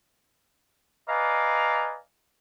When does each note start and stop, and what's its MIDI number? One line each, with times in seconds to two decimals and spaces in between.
1.08 1.97 71
1.08 1.97 74
1.08 1.97 75
1.08 1.97 77
1.08 1.97 80
1.08 1.97 82